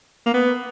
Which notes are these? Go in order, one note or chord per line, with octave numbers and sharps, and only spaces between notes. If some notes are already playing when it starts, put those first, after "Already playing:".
A#3
B3